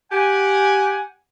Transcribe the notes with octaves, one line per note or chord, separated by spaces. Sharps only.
G4 F#5 G#5